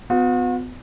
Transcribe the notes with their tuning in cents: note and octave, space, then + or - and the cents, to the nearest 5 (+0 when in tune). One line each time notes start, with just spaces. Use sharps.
B3 +30 F#4 -45